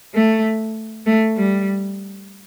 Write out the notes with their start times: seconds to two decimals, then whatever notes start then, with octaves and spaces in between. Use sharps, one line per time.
0.14 A3
1.06 A3
1.36 G3